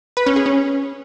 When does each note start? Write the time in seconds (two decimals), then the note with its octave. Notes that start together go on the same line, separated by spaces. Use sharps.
0.17 B4
0.26 C#4
0.36 G#4
0.46 C#4